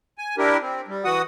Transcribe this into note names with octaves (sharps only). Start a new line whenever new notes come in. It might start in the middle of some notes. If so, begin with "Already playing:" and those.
G#5
D4 E4 G4 A#4
C4
G3
E3 F#4 F#5 D#6